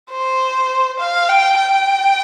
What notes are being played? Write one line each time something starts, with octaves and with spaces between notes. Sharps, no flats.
C5
F5
G5
G5